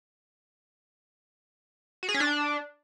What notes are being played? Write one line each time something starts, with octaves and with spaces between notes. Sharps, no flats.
F#4
G#4
C#4
D4